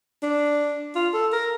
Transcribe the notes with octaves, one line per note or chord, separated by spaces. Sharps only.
D4
F4
A4
A#4